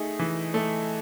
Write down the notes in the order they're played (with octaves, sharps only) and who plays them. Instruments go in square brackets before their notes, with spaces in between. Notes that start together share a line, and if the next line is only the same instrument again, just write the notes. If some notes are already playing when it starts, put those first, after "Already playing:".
Already playing: [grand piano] A3 D#4 G#4
E3
A3